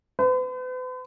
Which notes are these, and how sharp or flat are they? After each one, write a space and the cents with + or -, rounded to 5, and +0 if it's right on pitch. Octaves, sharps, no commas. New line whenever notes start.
B4 +45